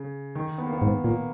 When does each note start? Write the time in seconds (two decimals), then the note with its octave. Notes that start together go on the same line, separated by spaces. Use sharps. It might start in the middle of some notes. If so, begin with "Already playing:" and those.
Already playing: C#3
0.35 D#3
0.58 B3
0.65 A#3
0.73 B3
0.82 G#2
1.04 A#2 A#3